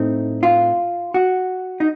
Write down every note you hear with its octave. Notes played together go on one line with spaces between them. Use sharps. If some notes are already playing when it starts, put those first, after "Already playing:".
Already playing: A2 A3 C4 D#4
F4
F#4
D#4